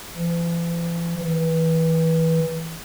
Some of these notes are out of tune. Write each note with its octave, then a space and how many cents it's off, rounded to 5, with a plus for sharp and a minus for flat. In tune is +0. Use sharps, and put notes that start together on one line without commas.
E3 +45
E3 -20